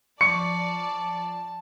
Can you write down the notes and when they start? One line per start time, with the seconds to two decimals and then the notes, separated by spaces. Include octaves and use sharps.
0.21 F3 D5 A5 C#6 C#7